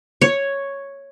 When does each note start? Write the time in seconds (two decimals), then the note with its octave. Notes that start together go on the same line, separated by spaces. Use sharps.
0.22 C#5